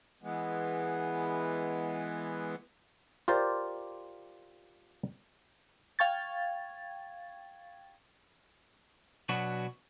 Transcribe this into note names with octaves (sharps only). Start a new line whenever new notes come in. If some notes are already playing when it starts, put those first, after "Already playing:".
E3 G#3 B3
F4 G4 A#4 C5 D5
F5 G5 C#6 G#6 A6
B2 F#3 B3 D4 F#4